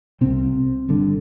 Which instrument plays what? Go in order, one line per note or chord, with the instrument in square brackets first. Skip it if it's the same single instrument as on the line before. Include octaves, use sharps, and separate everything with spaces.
[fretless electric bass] C2 C3 C4
G1 G2 D3